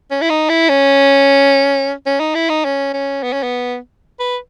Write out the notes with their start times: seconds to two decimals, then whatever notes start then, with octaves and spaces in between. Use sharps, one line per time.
0.11 C#4
0.21 E4
0.30 D#4
0.49 E4
0.69 C#4
2.06 C#4
2.20 D#4
2.35 E4
2.49 D#4
2.64 C#4
2.93 C#4
3.23 B3
3.32 C#4
3.43 B3
4.19 B4